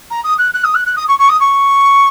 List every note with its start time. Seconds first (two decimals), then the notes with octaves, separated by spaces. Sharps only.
0.10 A#5
0.24 D#6
0.38 F#6
0.53 F#6
0.64 D#6
0.74 F#6
0.86 F#6
0.96 D#6
1.08 C#6
1.18 C#6
1.29 D#6
1.40 C#6